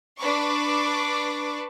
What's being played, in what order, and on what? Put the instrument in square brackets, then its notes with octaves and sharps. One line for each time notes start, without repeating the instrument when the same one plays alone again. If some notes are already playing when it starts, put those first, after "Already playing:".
[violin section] D4 B4 C#6 D6